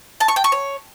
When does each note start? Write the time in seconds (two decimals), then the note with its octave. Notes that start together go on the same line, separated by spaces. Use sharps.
0.20 A5
0.28 C#6
0.36 G5
0.44 C#6
0.52 C#5